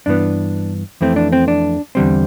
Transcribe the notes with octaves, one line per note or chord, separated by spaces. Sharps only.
G2 E3 B3 D4
F2 E3 A3 C4
D4
C4
D4
E2 D3 G3 C4